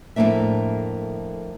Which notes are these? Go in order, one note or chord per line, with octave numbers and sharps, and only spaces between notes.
F2 A2 D#3 A#3 D4 E5